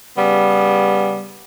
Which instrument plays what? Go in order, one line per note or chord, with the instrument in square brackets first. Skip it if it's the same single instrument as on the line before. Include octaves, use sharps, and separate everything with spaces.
[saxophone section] C#3 G3 B3